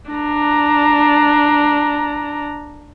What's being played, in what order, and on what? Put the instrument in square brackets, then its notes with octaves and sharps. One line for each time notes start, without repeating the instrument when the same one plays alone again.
[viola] D4 A#5